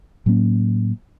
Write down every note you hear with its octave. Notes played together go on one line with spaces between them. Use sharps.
A2 F#3 A#3 C#4